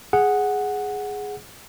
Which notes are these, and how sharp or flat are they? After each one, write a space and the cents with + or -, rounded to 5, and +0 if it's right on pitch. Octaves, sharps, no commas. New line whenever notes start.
G#4 +0 F#5 +0